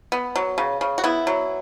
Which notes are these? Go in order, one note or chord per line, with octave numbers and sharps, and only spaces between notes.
B3
F#3
C#3
C#3
F#4
B3 E4
F#3